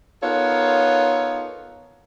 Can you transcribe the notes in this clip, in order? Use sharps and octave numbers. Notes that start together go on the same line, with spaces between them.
B3 D#4 F4 A4 A#4 C#5